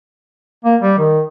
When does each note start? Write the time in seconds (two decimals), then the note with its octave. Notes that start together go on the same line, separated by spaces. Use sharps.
0.64 A#3
0.81 G3
0.98 D#3